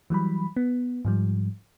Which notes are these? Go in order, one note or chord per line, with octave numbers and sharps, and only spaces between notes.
E3 F#3 G3 B5
B3
G#2 F3 G3